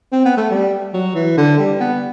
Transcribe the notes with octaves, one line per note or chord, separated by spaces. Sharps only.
C4
B3
A3
G3
F#3
E3
D3
G3
B3